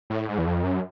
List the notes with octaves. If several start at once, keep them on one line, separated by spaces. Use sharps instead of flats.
A2
G#2
E2
F2
F#2